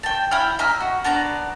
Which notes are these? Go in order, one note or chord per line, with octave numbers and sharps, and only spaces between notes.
G5 A5
E4 G5 B5 F6
D#5 E5 A#5 F6
F#4
B3 D4 D5 A#5